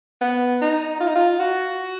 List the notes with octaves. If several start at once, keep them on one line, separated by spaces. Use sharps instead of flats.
B3
D#4
F4
D#4
F4
F#4